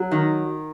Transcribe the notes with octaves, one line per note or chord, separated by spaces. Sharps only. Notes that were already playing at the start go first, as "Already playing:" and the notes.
Already playing: F#3
D#3